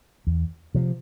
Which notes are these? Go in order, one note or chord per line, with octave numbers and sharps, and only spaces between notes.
E2
C3 F3